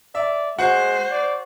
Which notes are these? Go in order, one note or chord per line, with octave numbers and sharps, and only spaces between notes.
D5 E5
G#3 F#4 C5 F#5
D5